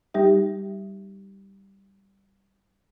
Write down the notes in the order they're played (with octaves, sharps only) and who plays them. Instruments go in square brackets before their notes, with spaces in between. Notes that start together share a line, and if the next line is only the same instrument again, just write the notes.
[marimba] G3 D#4 G4 E5